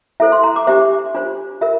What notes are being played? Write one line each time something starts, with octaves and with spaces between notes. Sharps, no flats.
E4 A4 C5 E5
C6
A#5
D6
D4 G4 C5 E5
D4 F4 C5
F4 A#4 E5